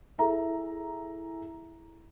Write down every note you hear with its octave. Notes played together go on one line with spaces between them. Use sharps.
E4 G#4 A4 E5 A#5